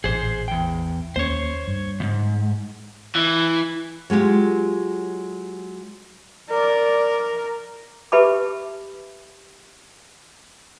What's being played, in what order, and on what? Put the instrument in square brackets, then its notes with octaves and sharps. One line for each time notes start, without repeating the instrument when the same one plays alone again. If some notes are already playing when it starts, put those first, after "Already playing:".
[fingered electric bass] A1 A#2 [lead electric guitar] G#4 C5
[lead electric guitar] E2 G5
[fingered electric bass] D#2 A#3 C#4 [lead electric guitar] C5 C#5
[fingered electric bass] G2
[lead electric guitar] D2 G#2
[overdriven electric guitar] E3
[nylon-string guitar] F#3 G#3 F4 G4
[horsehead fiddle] A#4 [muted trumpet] D5
[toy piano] G4 B4 E5 A5 B5 D6